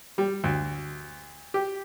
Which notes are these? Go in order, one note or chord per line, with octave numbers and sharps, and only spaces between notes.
G3
D2
G4